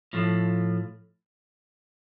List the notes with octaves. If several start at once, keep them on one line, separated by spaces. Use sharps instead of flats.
A2 F3 A3